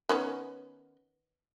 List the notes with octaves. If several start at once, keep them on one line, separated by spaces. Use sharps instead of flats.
D#3 B3 C#4